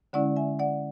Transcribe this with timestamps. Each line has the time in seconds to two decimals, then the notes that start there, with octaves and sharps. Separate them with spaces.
0.13 D3 G#3 C#4 E4 D5 F#5
0.36 E5 G#5
0.59 D5 F#5